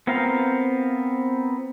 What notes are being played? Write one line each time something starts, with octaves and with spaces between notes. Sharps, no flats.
B3 C4 F4 A#4 F5